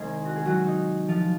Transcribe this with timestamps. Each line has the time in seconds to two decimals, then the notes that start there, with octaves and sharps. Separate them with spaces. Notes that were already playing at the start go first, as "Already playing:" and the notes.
Already playing: C2 C3 D#3 G#3 G#4
0.25 F#4
0.36 G#4
0.45 F#3 F#4
0.67 D#4
1.08 F3 F4